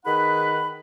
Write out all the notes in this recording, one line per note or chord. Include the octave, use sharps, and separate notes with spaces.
D#3 D#4 G#4 B4 F#5 B5